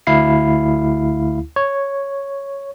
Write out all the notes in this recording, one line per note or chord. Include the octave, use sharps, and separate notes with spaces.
D2 E4 F5 C7
C#5